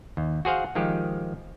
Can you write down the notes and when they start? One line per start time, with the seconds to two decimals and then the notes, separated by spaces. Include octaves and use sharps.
0.17 D#2
0.45 F#4 G#4 C5 F5 F#5
0.75 D#3 F3 G#3 G4